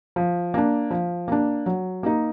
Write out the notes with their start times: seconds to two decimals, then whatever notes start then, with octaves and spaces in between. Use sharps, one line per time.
0.16 F3
0.54 A#3 D4
0.91 F3
1.28 A#3 D4
1.66 F#3
2.03 A#3 D#4